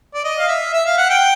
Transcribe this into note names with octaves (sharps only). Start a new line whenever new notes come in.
D5
D#5
F5
E5
E5
F5
F#5
G5